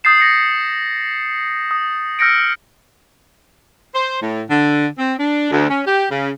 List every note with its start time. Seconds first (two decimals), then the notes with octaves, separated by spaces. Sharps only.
0.04 D#6 G6 A6 C7 E7
0.20 A6 A#6 C7 C#7
1.71 D#6
2.19 E6 F6 G6 A#6 C#7 D7
3.94 C5
4.21 A2
4.49 D3
4.98 C4
5.19 D4
5.51 D2
5.70 C#4
5.87 G4
6.10 C#3